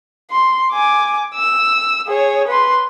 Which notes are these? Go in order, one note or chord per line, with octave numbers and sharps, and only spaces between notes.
C6
G#5 D6
E6
G#4 C#5
B4 C6